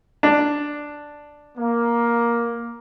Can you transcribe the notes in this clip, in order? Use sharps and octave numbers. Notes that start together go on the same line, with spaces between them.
D4
A#3